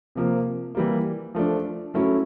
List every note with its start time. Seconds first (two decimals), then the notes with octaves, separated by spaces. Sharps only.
0.15 C3 F3 A#3
0.75 E3 G3 A#3
1.35 F3 A3 D4
1.94 F#3 A3 C#4 E4